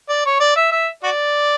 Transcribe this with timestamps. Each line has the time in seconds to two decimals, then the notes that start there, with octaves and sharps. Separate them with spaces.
0.09 D5
0.26 C#5
0.40 D5
0.56 E5
0.72 E5
1.03 F#4 D5